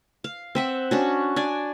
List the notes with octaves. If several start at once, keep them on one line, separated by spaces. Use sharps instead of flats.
F5
C4 E5 F#5
C#4 D4 F#4
D4 D5 G#5